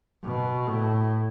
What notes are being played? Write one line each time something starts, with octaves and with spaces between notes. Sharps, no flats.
B2
A2